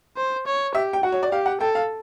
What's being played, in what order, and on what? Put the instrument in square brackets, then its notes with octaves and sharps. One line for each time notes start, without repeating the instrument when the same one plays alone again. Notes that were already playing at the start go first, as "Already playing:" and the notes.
[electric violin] C5
C#5
[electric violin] G4 [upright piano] E5
[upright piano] G5
[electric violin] F#4 [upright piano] F#5
[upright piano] C#5
D5
[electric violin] G4 [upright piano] F5
[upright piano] F#5
[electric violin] A4 [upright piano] G5
[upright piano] F5